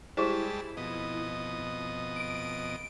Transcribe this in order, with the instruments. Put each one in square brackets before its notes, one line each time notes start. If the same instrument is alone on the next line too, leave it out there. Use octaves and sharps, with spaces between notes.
[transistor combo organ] G3 G#3 A5 [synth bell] E4 [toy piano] G4 G#4 C5
[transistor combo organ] F2 B2 D#5
[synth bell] D7